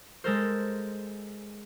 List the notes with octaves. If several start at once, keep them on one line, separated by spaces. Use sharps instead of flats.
G#3 A4 A#4 C5